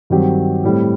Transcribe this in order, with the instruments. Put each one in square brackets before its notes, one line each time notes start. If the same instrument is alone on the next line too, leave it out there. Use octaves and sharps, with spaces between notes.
[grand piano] G2 D#3 F#3 C4 G4
A2 G3 C4